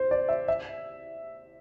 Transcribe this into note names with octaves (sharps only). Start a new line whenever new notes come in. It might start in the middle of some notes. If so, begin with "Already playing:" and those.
Already playing: C5
D5
E5
E5